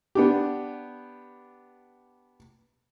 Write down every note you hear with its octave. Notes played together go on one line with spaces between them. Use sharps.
B3 D4 G4